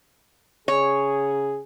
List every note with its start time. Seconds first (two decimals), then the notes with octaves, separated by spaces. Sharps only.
0.68 C#3 G#4 C#5